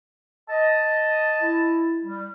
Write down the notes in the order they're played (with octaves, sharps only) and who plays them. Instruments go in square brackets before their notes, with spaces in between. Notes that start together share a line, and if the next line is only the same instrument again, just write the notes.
[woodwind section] D#5 [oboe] A5
[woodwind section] E4
G3